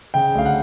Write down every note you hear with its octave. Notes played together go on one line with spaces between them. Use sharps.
C#3 G5
D2 F5
F#5